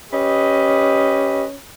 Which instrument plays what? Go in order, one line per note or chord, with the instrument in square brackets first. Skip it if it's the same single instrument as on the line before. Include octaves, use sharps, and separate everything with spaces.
[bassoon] C#4 [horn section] G4 B4 D#5